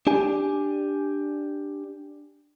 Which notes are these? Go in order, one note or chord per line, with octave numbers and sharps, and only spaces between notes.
D4 G4 G#5